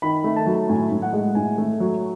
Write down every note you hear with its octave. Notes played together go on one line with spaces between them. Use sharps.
D#3 B5
A3
A5
F#3
A2 G#5
A2
F#5
G#3
A2 G#5
A3
F#3